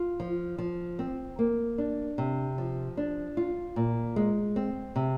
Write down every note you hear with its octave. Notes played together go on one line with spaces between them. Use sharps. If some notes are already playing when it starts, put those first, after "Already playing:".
Already playing: F4
F3
F3
C4
A#3
D4
C3
F3
D4
F4
A#2
G#3
C4
C3